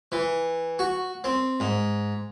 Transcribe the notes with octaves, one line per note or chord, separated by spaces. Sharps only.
E3
F#4
C4
G#2